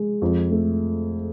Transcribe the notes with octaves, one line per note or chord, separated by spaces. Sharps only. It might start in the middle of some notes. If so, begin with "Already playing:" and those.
Already playing: G#3
F2
A3